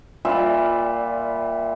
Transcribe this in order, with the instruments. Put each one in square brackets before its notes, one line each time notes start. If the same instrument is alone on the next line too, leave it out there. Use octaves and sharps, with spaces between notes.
[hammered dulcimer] A#2 G3 F4 E5